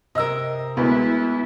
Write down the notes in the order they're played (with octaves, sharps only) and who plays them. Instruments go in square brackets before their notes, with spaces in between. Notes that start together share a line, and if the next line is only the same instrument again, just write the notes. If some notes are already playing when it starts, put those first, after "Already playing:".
[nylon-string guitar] C3 A#4 [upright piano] D#5 E6
[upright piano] D2 G#3 [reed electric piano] B3 B4 [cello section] E4